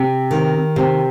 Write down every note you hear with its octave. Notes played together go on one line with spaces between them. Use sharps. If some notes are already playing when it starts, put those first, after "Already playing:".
Already playing: C3
D#3
C3